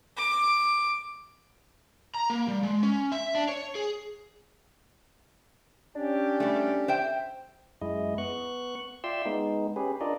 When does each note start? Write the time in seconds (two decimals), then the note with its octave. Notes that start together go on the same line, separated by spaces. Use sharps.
0.17 D6
2.15 A#5
2.30 A#3
2.48 G3
2.63 G#3
2.83 C#4
3.12 E5
3.35 D4
3.49 C#5
3.75 G#4
5.95 C#4 D4 G4
6.40 G3 A3
6.88 C5 E5 G5
7.82 F#2 G#3 E4 D#5
8.18 B3 C#6 F#6
9.04 F4 D5 E5 G5 C6 E6
9.25 G#3 B3 D#4
9.76 C#4 G4 G#4 B4
10.01 D4 F4 A#4 D5 D#5